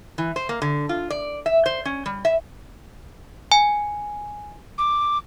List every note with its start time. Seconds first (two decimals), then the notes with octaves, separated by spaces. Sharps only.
0.18 E3
0.36 C5
0.49 A#3
0.62 D3
0.89 F4
1.10 D5
1.46 E5
1.66 C5
1.85 C#4
2.06 G3
2.25 E5
3.52 G#5
4.78 D6